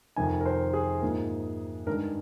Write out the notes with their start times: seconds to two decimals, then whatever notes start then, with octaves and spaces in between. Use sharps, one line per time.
0.16 F2 C3 D#3 G#5
0.41 A#4
0.46 C5
0.74 G#4
1.02 G#2 F3 A#3
1.87 G2 D#3 G#3 A#4